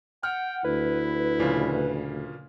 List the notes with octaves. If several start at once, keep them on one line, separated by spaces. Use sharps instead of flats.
F#5 G5 F6
D2 E4 B4
A#2 C#3 F3